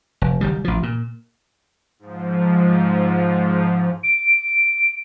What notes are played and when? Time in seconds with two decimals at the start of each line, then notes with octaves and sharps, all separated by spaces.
0.22 F1
0.41 F#1 D#3 G3
0.65 A1 F3
0.83 A#2
1.99 G#2 F3
4.03 D7